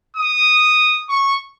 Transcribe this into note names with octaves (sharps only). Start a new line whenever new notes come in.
D#6
C#6